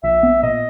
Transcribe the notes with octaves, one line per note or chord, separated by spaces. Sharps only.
A#1 E5
B3
A#2 D#5